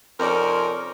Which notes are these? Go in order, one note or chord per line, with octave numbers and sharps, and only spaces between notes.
F2 C3 C#4 D#4 A#4 D5